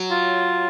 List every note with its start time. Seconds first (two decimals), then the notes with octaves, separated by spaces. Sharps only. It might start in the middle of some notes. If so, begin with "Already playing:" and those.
Already playing: F#3
0.10 F4